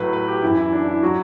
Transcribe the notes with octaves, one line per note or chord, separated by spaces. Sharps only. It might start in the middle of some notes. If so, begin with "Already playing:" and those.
Already playing: A2 F#3 B4
B4
G4
F#2 E3 E4
E4
D4
E4
F#3 F#4